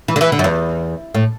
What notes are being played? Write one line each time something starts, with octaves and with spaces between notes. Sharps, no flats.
E3
D3
E3
D3
F#2
E2
A2